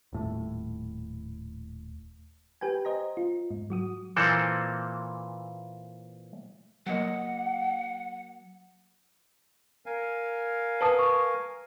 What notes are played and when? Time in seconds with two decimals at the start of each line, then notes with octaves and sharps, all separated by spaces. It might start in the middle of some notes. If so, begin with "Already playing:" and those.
0.13 D#1 A2
2.61 G4 B4 G5 G#5
2.85 C5 D#5 A#5
3.17 F4
3.51 G#2
3.70 F#3 F#4 D#6
4.16 A#2 E3 A#3 C4 A4
6.86 F#3 A#3 D#5 F#5
9.86 A#4 F5 G#5
10.81 B4 A5 D#6
10.99 C#6